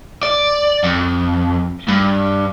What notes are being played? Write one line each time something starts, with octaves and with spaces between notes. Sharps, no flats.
D5
F2
G2